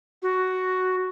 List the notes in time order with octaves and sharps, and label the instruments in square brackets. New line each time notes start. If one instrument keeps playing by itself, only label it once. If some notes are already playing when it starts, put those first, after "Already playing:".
[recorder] F#4